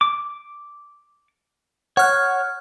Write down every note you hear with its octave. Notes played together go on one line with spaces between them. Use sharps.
D6
C#5 F#5 F6 F#6